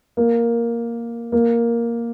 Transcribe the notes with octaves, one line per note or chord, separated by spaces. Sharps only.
A#3
A#3